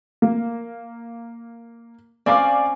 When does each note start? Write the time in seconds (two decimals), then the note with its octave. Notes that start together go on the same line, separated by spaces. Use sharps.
0.22 A#3
2.26 C4 C#4 D5 F5 G#5 D6